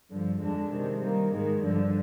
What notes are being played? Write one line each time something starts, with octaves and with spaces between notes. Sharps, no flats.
G2 D3 F3
F2 D3 G#3 D4
C3 D#3 G#3
D#3 G3 A#3
G#2 D#3 G#3
G2 D3 F3